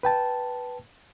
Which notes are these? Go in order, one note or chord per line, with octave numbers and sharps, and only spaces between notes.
B4 G5 A5